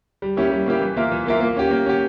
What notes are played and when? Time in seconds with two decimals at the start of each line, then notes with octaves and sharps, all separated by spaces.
0.22 G3
0.37 A#3 C#4 E4 G4
0.51 G3
0.66 A#3 C#4 E4 G4
0.81 E3
0.96 A#3 F4 A#4 E5
1.11 E3
1.26 A#3 F4 A#4 E5
1.41 A#3
1.57 C#4 G4
1.71 A#3
1.86 C#4 G4